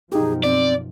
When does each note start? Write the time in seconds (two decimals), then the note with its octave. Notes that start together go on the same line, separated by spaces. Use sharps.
0.12 F#2 B2 F3 D#4 G4 G#4
0.43 C4 D5